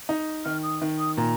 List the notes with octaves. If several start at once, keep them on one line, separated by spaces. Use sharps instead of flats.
D#4
D#3 F6
D#6
D#3
D#6
A#2 A#5